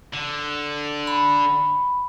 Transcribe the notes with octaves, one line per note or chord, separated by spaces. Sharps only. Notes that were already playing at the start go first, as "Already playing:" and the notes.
D3
B5